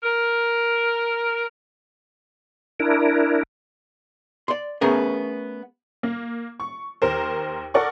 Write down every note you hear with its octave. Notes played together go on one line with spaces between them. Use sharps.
A#4
D4 E4 A#4
D5 C6
A3 B3 C#4 G#4 A#4
A#3
C#6
D#2 A#4 C5
A4 A#4 D5 F#5 C#6